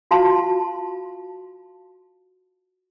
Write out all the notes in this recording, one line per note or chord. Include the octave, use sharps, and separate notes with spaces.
F4 F#4 F5 A5 C6